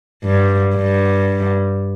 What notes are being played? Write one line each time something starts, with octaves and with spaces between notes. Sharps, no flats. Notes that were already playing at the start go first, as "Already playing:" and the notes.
G2
G2